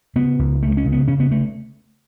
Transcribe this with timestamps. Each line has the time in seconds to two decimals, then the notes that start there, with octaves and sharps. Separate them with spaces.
0.16 C#3 B3
0.39 C#2
0.62 C#2 A3
0.77 C#4
0.85 C#3
0.92 B3
1.08 C#3 C#4
1.20 B3
1.31 A3